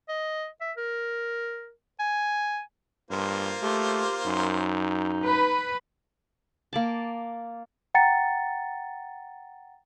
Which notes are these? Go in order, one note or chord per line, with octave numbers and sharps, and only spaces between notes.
D#5
E5
A#4
G#5
G2 A#3 F4 C5
A3 G4
F#2 D#4
B4
A#3 D5 A5
F#5 G5 A#5 A6 C#7